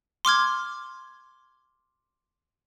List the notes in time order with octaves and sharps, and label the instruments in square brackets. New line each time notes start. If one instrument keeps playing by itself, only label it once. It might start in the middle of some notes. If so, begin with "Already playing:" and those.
[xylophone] C6 D6 F6 G#6